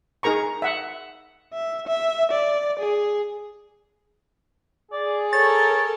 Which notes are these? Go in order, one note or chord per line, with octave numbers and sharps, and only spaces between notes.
D#4 G#4 A#4 A#5 C#6
E5 F#5
E5
E5
D5
G#4
G#4 D5
A4 A#4 C#5 A6